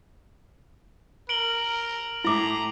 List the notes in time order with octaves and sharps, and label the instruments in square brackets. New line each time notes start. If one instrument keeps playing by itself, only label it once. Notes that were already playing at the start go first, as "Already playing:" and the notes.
[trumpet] A#4 [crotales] D7 F#7 G7
[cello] A2 [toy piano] E4 D6 [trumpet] A#5